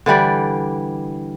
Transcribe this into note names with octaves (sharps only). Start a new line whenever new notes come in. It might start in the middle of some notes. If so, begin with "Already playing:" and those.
D3 E3 G3 D5